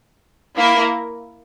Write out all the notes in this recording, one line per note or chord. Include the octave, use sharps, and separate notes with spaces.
A#3 E4 A#4